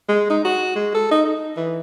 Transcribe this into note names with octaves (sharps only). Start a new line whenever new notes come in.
G#3
D#4
F#4
G#3
A4
D#4
D#4
E3